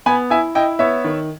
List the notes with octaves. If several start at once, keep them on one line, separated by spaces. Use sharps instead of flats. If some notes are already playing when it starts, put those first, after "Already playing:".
B3 G#5 B5
E4 E5 G#5
E4 D#5 G5
B3 C#5 E5
D#3